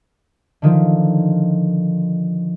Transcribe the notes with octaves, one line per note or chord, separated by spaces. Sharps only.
D3 D#3 F3